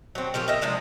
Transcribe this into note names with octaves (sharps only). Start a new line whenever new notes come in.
F#3 C4
C#3 F3 G4 A#4
A#4 D#5 E5
C3 F3 G#3 D4